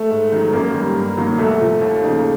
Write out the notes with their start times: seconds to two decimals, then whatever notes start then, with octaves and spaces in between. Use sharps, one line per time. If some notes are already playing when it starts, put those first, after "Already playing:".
Already playing: A3
0.10 G#2
0.32 D#3 F#3
0.53 F#2 A#3
0.74 D#3 G3
0.96 G2
1.17 D#3 F#3 A#3
1.38 C2 A3
1.60 A#2 F3
1.81 D#2
2.03 C#3 F3 A#3 D#4